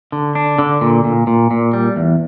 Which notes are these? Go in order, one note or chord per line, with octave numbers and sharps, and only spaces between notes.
D3
D4
D3
A#2
A#2
A#2
A#2
G3
E2